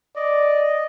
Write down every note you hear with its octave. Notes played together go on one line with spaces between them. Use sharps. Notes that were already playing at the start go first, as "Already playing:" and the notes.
D5 D#5